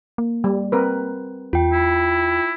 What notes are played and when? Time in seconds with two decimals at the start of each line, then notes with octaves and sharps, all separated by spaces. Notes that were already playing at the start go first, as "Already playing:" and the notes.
0.18 A#3
0.44 G3
0.72 C4 A#4 B4
1.53 E2 F4 G5
1.72 E4